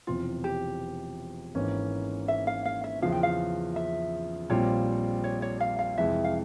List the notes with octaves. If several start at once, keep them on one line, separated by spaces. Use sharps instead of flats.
E1 E2 C3 F3 C4 F4
G4
G#1 G#2 E3 A#3 C#4
E5
F5
F5
E5
E2 C#3 F3 F5
G5
F5
E5
A#1 A#2 G3 C4 F4 C#5
C#5
C#5
F5
F5
F2 C3 E3 G#3 E4 E5
F5